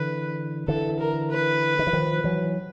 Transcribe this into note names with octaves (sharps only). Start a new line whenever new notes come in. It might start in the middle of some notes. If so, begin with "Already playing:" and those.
Already playing: D3 E3 B4
D3 E3 A4
A#4
B4
D#3
E3
D#3 F3
E3 F#3